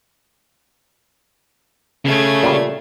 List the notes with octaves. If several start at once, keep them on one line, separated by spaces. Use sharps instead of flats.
C#3 A3 C#4 G#6
A#2 G3